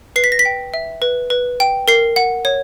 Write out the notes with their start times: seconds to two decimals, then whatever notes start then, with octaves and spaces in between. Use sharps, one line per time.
0.16 B4 C7
0.24 B6
0.32 A#6
0.39 B6
0.45 G5
0.74 E5
1.02 B4
1.30 B4
1.60 G5
1.88 A#4 C7
2.16 F#5
2.45 C#5